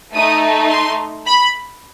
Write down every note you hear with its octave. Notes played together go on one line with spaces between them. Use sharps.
A3 D#4 A4 D#6
C6
B5